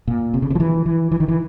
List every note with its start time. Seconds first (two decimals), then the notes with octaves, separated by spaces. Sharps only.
0.08 A#2
0.34 C3
0.42 C#3
0.50 C3
0.55 F3
0.60 E3
0.86 E3
1.12 E3
1.20 D#3
1.28 E3